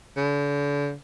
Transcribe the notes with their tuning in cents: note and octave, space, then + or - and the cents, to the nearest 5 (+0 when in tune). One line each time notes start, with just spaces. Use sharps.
D3 -40